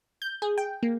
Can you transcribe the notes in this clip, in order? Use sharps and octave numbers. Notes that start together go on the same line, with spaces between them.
G6
G#4
G5
A#3